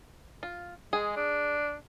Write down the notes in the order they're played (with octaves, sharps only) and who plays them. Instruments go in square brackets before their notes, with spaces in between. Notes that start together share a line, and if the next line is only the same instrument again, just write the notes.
[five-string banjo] F4
[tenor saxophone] G#3 [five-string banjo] G#4
[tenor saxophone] D4